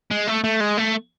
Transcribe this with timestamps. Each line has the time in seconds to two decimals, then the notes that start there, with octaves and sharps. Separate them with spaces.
0.11 G#3
0.27 A3
0.44 A3
0.60 G#3
0.78 A3